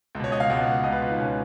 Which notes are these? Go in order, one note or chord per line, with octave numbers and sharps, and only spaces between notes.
C#2
B2 C#5
D#5
F5
C#2 B2 F#5
C#2 B2 B4 D#5
F4
D#4
C#2 B2 C#4